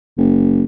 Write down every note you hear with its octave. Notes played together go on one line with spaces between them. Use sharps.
F#1